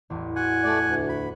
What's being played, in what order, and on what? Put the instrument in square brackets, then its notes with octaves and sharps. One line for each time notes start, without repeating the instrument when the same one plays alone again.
[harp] A1 E2
[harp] F#4 [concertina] F#5 G#5
[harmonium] A3 D5
D2
[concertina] B5